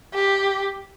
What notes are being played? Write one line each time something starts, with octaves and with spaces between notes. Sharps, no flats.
G4